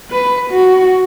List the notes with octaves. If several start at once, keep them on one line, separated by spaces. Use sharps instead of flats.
B4
F#4